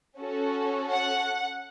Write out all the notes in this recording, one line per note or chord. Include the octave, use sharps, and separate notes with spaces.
C#4 F#4 A4
F#5